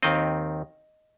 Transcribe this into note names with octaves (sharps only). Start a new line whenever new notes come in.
D#2 D#3 C4 D#5